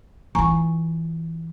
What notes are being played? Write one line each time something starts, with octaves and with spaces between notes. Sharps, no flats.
E3 F4 G#5 A#5 C#6